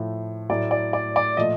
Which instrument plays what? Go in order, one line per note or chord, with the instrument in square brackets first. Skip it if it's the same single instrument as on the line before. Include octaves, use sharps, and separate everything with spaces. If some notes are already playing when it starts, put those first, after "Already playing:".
Already playing: [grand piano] A2 F3 A3
A2 F#3 A3 D5
D5
D5
D5
A#2 F3 A3 D#5